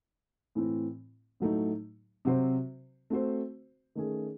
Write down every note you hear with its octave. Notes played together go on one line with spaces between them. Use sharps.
A2 E3 C4
A2 F#3 A3 D#4
C3 F#3 C4 F#4 C5
A3 C4 F#4 C5
D#3 A3 C#4 G#4